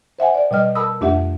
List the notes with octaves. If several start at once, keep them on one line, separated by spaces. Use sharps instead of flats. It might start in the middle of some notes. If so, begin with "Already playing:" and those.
C5 E5 F#5 G#5
D5
B2 G3 D#5 F6
A#4 A5 B5 D#6 E6
F2 A3 D4 G4 E5 F#5